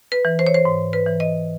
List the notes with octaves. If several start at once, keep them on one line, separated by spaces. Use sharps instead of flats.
B4
E3
C5
C#5
C5
G#2
B4
E3
D#5